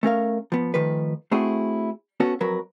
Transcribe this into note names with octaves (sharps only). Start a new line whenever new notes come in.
A3 C#4 A#4 F5
F3 B3
D#3 F3 A3 B4
A3 C4 E4 F#4 G#4
B3 C#4 F#4 A4
F2 F#3 A#4 B4